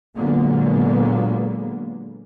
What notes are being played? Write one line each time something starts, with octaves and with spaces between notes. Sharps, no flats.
A#2 D3 F#3 G#3 A#3 B3